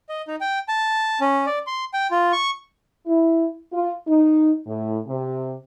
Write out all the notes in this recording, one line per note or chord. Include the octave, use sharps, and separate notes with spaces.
D#5
D#4
G5
A5
C#4
D5
C6
G5
F4
C#6
E4
F4
D#4
A2
C3